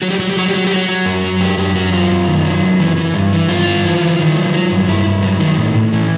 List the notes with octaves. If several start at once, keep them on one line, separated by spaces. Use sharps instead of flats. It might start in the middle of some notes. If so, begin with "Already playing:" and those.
F#3 F#4
G4
F#3 F#4
G4
F#3 F#4
G4
F#3 F#4
G4
F#3 F#4
F#3
F#2
F#3
F#2 G4
F#2 G4
F#3 F#4
F#2 F4
F#2
D#3
F#3
F#2
E3
E3
G2
E3
G2 F4
G2
E3
E3
D#3
F#3
F#3
G2
G2 E4
G2
F#3
D#3
A2
A2
E3